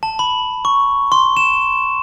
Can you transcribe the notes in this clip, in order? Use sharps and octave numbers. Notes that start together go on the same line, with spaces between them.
A5
B5
C#6
C6
E7